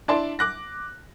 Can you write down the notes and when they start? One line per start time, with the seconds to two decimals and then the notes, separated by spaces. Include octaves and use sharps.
0.08 D4 E4 D5 A5 C6
0.39 D6 F#6 A#6